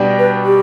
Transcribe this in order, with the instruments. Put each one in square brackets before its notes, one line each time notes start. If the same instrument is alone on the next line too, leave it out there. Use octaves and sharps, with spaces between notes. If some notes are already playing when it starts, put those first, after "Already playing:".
Already playing: [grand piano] B2 G3 D4 G4
[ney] B4
G4